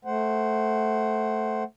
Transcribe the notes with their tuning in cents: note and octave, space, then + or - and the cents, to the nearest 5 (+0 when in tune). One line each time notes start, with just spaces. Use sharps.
A3 +0 C5 +0 F#5 +15